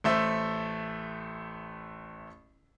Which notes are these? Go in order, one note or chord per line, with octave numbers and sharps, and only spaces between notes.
A1 A3 C5 E5